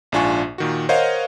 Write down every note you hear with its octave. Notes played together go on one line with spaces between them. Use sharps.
A#1 G#2 D4 F4 G#5 C#6
A#2 D#3 F#4
A#4 C5 C#5 D#5 F5 F#5